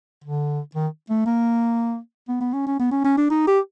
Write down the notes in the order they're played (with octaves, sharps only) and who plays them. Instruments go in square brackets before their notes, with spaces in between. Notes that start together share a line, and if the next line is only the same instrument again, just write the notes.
[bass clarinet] D3
D#3
A3
A#3
B3
B3
C#4
C#4
B3
C#4
C#4
D4
D#4
G4